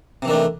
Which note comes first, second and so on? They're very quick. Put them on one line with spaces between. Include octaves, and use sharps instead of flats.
C3 E3 D#3 D4 A3